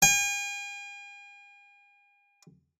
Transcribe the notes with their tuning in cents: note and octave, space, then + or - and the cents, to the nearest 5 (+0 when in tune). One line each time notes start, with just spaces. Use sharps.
G#5 -45